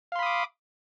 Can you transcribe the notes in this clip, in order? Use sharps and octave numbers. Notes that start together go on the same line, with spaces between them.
F5 B5 C6 D6 D#6